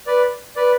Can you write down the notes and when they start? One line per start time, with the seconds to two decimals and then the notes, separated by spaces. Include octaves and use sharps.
0.07 B4 D5
0.56 B4 D5